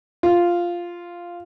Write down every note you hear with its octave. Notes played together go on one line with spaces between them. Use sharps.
F4